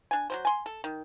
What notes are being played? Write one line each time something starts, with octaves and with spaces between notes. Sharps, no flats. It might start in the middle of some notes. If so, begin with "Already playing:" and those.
D4 G#5
F#3 G3 C5
G#5 C6
A4
D#3